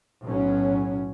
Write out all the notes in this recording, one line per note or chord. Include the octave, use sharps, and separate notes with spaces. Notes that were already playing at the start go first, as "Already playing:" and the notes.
B1 A2 F#3 C#4